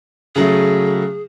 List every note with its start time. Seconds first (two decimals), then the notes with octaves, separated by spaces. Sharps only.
0.36 C#3 F#3 A3 G#4